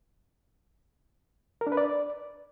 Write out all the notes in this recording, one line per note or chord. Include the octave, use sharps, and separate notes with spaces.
A#4
D4
B4
D5